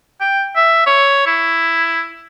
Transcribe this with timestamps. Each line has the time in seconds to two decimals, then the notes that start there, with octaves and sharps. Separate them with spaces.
0.21 G5
0.56 E5
0.86 C#5
1.26 E4